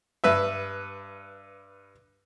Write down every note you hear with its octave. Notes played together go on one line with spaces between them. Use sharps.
G2 B4 E5